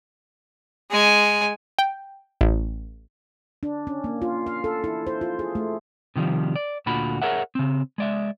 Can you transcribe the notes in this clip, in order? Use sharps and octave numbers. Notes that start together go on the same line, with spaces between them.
G#3 G#5
G5
A1
D4
C#4
A#3
F4
F5
A4
E4
C5
F4
G#4
A3
C3 D#3 F3 G3
D5
D2 A#2 D3 F4 F#4 B5
G#4 A#4 C#5 E5 F#5
C#3 C4
G#3 D5 E5